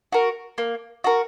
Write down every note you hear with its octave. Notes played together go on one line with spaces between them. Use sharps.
F#4 A#4
A#3
F#4 A#4